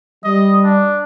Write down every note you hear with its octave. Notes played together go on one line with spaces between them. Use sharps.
G3 D#5
D4